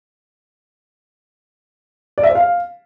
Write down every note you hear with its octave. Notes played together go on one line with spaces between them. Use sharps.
D5
E5
C5
F5